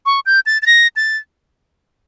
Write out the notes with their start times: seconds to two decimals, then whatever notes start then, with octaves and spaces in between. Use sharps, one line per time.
0.06 C#6
0.26 G6
0.46 A6
0.62 A6
0.66 A#6
0.96 A6